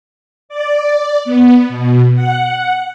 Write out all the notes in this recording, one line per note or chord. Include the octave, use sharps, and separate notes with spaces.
D5
B3
B2
F#5